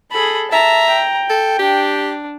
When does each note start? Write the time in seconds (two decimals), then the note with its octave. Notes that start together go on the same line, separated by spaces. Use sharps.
0.12 G#4 A4 B5
0.52 E5 A5 A#5
0.92 G5
1.30 A4
1.59 D4 G4